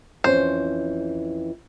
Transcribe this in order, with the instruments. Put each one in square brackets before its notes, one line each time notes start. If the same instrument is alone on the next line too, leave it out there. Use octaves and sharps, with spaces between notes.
[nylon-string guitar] F2 E3 C#4 [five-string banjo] C5